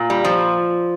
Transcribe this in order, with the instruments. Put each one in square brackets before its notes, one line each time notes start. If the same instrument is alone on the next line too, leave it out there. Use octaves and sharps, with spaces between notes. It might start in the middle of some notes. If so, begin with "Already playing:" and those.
Already playing: [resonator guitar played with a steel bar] A#2
G3
F3